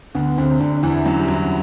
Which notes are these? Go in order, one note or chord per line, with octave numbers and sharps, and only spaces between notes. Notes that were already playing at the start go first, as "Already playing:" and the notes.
D2 D3 B3
D2 D3 C4
C3
D2 D3 D4
D4
E2 E3 E4
F#2 F#3
G3
F#2 F#3